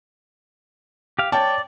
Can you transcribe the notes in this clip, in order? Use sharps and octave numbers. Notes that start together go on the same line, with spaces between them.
G4 F5
C#5 D5 G5 A5